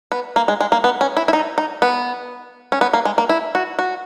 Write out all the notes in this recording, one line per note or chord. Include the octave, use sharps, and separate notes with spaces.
B3
A#3
G#3
G#3
A#3
B3
C#4
E4
E4
D#4
D#4
B3
C#4
B3
A#3
G#3
A#3
E4
F#4
F#4